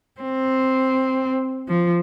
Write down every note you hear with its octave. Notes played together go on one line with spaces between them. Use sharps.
C4
F3